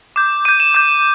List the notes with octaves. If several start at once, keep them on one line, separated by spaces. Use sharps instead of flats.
D6 G6
D6 G6 D#7
E7
D6 G6